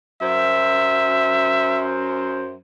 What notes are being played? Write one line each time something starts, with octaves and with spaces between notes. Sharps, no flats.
F#2 C5 E5